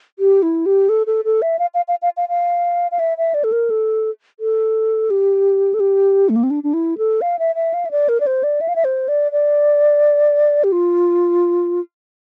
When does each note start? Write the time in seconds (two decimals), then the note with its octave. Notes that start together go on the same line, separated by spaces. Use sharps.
0.19 G4
0.42 E4
0.66 G4
0.89 A4
1.07 A4
1.25 A4
1.42 E5
1.59 F5
1.74 F5
1.88 F5
2.02 F5
2.17 F5
2.29 F5
2.92 F5
2.99 E5
3.18 E5
3.34 D5
3.44 A4
3.52 A#4
3.70 A4
4.40 A4
5.10 G4
5.74 A4
5.80 G4
6.29 A3
6.36 A#3
6.43 C4
6.51 D4
6.64 D4
6.74 E4
6.98 A4
7.21 F5
7.39 E5
7.55 E5
7.74 F5
7.85 E5
7.91 D5
8.09 A#4
8.20 D5
8.27 C5
8.43 D5
8.61 E5
8.68 F5
8.76 E5
8.85 C5
9.08 D5
9.32 D5
10.64 G4
10.72 F4